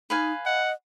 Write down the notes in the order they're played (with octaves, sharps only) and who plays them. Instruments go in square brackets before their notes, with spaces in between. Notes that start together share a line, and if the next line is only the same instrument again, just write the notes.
[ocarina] D#4 [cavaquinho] B4 F5 G#5
[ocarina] D#5 [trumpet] F#5